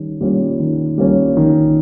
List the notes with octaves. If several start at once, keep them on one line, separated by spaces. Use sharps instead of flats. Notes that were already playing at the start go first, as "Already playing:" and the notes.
Already playing: D#3 G3 C#4
G3 A#3 C#4 F4
D#3
G3 A#3 C#4 F4
D#3